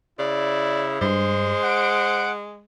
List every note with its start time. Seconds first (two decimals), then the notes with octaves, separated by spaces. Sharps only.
0.19 C#3 E4 D5
1.01 G2 G#3 C5
1.64 F#5 D7